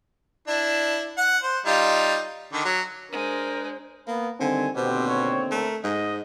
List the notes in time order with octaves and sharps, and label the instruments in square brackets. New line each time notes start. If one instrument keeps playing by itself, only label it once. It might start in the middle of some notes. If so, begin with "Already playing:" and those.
[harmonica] D4 E4
F#5
C5
G3 D#4 F4
D3 D#3
F#3
[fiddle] G#3 [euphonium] D4 [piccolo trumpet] A#4 [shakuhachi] C5
[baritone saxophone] A#3 [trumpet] B3
[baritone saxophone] D3 [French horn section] D#3 G3 C4 [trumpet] G#5
[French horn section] D#2 D3 C4 [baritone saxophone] B2 [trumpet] G4
[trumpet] C#5
[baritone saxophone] A3 [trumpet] A#4
[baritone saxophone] G#2 [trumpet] D#5